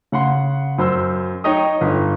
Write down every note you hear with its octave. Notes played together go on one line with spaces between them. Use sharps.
C#3 F#5 C6
F#2 C5 C6 E6
D#4 C#5 D#5 G5 A#5 D#6
G1